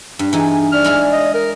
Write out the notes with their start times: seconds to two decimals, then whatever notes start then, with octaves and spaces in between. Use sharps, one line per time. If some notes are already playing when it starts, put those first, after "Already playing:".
0.19 G2 D4
0.33 E3 D#4 G#4
0.72 D5 F6
0.84 G#3 E4 G#4
1.12 D#5
1.34 A#4